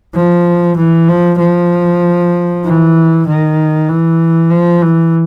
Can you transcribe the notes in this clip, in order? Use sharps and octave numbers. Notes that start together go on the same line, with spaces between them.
F3
E3
F3
F3
E3
D#3
E3
F3
E3